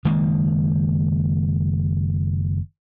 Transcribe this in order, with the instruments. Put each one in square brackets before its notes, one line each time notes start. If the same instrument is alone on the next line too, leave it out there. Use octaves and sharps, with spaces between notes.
[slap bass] F#1 D#3 G#3 A#3